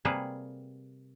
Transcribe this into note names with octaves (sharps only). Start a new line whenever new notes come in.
C3 G3 A#3 G#4 B4